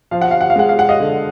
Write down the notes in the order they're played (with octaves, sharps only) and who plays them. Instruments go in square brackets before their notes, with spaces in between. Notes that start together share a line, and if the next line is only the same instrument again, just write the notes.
[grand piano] F3 [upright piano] F5
[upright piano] F#5
F5
F#5
F5
[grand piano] G#3 [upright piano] F#5
[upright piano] F5
F#5
D#5 F5
[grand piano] D3